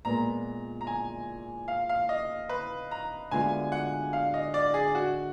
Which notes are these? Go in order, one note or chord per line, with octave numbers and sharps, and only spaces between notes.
A#2 G#3 B3 A#5
A#5
G#5
F5
F5
D#5
B4
A#5
D2 D3 G#3 B3 F4 G#5
F#5
F5
D#5
D5
G#4
F#4